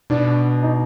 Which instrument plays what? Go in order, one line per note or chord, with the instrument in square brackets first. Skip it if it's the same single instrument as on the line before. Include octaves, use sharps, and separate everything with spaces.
[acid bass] B2 [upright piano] D4
[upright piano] D#4